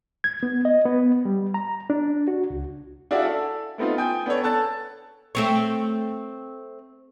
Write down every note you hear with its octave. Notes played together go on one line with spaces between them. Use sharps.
G#6
B3
D#5
B3
G3
A#5
D4
F#4
C#2
D4 E4 F#4 G#4 D5 F5
A4
A3 B3 C4 D#4 F4
G5 G#5 D#6 G6
B3 D4 A4 C#5
A4 A5 F#6 A6
A3 C4 C#5